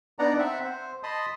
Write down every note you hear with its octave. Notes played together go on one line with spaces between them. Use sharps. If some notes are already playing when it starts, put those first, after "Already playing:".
B3 D4 D#4 D5 F#5 A#5
C4 E5 F#5
C5
D#5 A5 B5 C6 D#6